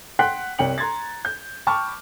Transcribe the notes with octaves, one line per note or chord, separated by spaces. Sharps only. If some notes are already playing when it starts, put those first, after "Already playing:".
F#5 G5 C6 F#6 B6
C2 C#5 G5 C#7 F#7
A#5 C6 G#6 A6
G6
G5 A5 B5 C#6 D6 F6